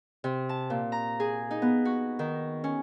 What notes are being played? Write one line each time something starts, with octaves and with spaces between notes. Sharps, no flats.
C3
A5
A#2
A#5
G#4
D#4
B3
F#4
D#3
C#4